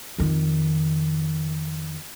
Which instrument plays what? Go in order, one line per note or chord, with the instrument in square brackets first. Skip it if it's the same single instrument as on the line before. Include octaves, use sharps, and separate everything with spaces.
[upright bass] F2 D#3